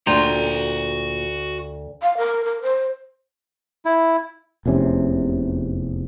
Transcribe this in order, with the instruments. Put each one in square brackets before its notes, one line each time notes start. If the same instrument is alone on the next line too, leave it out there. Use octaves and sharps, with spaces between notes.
[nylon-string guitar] D2 [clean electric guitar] A#2 G5 A#5 [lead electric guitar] F#4 C6
[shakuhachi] F5
A#4
A#4
C5
[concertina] E4
[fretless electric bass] F1 E2 C3 C#4